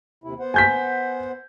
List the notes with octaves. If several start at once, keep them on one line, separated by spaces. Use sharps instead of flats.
D#2 C3 E4
B3 C5 F#5
G#5 G6 B6